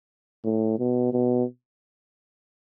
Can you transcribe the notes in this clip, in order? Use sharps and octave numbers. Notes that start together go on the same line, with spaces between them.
A2
B2
B2